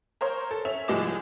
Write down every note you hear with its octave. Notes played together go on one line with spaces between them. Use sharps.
A#4 C5 C#5 C6
A4
C#4 E5 F7
C2 F3 G#3 D#5 D6 E7